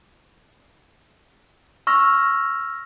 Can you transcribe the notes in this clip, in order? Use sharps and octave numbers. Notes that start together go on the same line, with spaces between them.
C#6 E6 F6 A#6